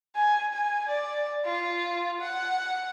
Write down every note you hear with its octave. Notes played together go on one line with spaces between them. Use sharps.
G#5
G#5
D5
F4
F#5